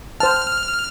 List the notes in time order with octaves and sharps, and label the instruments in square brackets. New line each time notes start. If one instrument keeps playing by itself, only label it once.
[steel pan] C5 A5 [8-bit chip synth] F6